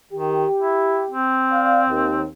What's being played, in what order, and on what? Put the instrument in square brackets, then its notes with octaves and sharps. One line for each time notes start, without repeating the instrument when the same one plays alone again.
[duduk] D#3 [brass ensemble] G4
[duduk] E4
C4
[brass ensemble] D5 F5
D#2